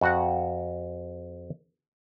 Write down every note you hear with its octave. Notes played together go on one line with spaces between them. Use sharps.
F2 F#4 F#5